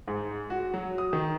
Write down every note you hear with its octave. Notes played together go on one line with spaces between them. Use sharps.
G#2
F#4
F#3
D#6
D#3